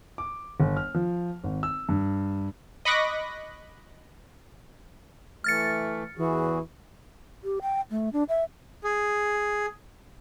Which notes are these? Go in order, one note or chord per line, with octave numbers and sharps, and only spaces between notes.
D6
G1
F6
F3
G#1
E6
G2
D#5 B5 C#6 D6 F#6 A#6
E3 A3 F6 A6 C#7
E2 E3 F#4 G#4
G4
G5
A3
D4
E5
G#4